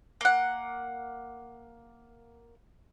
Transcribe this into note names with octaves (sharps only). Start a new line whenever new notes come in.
A#3 F#5